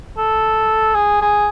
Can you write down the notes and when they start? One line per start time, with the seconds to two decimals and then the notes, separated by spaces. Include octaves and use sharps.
0.17 A4
0.95 G#4
1.22 G#4